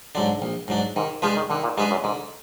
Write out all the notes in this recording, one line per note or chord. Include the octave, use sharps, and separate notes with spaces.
G#2 D3 F#3 D4
A#1
G#2 F#3 D4
G#2 D#3
F3 G#3 D4 G#4 B4
D#3
D3 D#3
A#2
G#2 G#3 D4 G#4 B4
F#2
G#2 D3